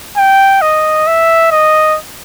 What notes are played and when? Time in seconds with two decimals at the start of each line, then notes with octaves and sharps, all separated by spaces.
0.17 G5
0.62 D#5
1.07 E5
1.51 D#5